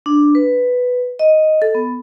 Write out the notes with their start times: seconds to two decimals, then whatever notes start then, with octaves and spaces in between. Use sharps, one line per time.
0.06 D4
0.35 B4
1.19 D#5
1.62 A4
1.75 B3